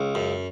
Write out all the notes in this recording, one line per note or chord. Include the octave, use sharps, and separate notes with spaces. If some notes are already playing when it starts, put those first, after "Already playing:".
Already playing: C#2
F#2